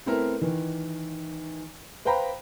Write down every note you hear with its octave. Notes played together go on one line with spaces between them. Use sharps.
A3 B3 C4 E4 A4 A#4
D#3 E3
B4 C5 F5 G5 A#5 B5